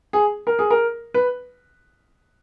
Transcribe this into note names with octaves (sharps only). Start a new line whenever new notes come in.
G#4
A#4
G#4
A#4
B4